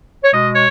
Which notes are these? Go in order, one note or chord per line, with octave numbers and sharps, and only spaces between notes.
C#5
B2 G#3 D#5
C#5